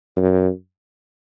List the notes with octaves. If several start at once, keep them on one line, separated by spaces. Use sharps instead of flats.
F#2